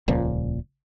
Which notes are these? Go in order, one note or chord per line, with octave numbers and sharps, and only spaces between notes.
D#1 C#2 A#2 F3